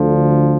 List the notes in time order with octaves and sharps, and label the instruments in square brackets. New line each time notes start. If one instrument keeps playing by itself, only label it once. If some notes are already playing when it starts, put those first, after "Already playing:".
Already playing: [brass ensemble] D2 D3 F3